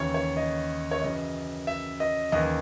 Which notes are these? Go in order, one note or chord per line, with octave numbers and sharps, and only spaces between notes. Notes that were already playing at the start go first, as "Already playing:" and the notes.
Already playing: D#2 C#3 E3 C#5
C#5
D#5
C#5
F#2 C#3 E3 D#5
E5
D#5
D#2 C#3 E3 D#5